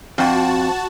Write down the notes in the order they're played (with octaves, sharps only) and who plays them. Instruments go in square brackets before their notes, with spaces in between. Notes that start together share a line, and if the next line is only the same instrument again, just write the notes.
[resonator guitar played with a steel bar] F2 C4 [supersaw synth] F#4 A5